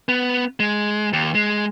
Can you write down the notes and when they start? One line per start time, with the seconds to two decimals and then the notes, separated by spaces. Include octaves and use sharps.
0.09 B3
0.60 G#3
1.13 D#2
1.35 G#3